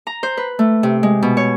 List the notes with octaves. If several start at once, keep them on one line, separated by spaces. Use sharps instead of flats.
A#5
C5
B4
A3
C3
G#3
B2
C#5